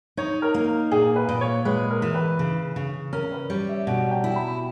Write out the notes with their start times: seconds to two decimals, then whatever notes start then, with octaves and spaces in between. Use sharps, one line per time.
0.17 D#4 C#5
0.42 A#4
0.54 A#3
0.92 A#2 G#4
1.16 B4
1.29 A#2
1.41 C#5
1.65 G#3 B4
1.90 A#4
2.02 E3
2.14 B4
2.39 C#3
2.76 C#3
3.13 C#4 A#4
3.32 B4
3.50 G3 C#5
3.69 E5
3.87 B2 C#5
4.11 G5
4.24 E4
4.36 B5